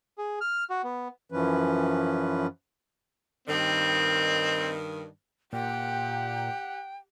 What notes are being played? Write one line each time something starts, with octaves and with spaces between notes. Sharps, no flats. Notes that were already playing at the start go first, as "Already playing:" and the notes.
G#4
F6
F#4
B3
F#2 E3 F3 C#4 B4
G2 D#3 C4
A#2 G4 F#5 G5